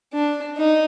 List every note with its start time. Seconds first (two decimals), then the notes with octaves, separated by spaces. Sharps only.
0.13 D4
0.57 D#4